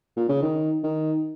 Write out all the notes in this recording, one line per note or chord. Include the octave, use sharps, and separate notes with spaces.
A#2
C#3
D#3
D#3